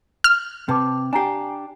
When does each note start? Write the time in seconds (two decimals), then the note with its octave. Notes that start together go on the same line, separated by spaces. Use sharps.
0.24 F6
0.69 C3 B4 A5 D6
1.13 D4 G4 G#5 A#5 C7